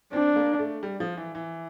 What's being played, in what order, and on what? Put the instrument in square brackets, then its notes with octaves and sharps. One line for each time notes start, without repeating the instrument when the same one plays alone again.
[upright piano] C4 [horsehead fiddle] D4
[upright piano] A#3
A3
G3
F3
E3
E3